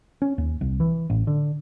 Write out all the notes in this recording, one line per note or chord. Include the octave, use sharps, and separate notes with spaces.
C#4
D#2
C2
E3
A1
D3